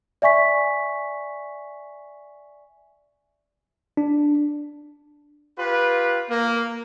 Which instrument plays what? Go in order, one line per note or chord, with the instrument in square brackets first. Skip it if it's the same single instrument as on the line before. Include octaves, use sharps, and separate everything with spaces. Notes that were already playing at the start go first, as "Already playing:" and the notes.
[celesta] D5 E5 G#5 C#6 B6
[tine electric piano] D4
[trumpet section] F4 G4 B4
A#3